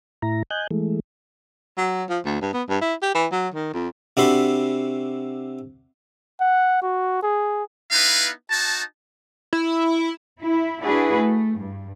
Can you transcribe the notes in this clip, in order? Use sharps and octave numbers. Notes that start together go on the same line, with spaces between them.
A2 E4 A#5
D#5 G#5 F#6 G6
E3 G#3 A3
F#3
F3
D2
G2
B3
G2
E4
G4
E3
F#3
D#3
F2
C3 D4 F#4 A4 B5 C6
F#5
F#4
G#4
B3 D#4 E4 B4 F5
D#4 F#4 A5
E4
E4
D4 E4 F#4 G#4 B4
A3
G2